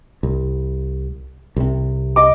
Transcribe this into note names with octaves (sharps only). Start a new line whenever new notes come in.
C2
C2 C3
D#5 D6